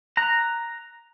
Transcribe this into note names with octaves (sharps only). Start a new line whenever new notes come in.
A#5 F#6